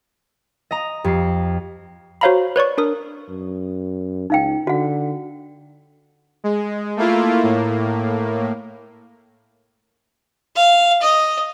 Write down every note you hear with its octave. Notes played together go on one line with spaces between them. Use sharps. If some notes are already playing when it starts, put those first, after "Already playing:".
D#5 A#5
F2 G4 C7
F#4 C5 C#5 F5 A#5 B5
B4 C#5 D5 C#6
D4 A#4 D#6
F#2
C#2 D#4 F5 G5
D3 F#4 F#5
G#3
A3 A#3 E4 F4
A2 A#3
F5
D#5